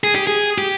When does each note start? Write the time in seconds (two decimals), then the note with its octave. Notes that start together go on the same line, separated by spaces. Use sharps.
0.04 G#4
0.15 G4
0.27 G#4
0.58 G4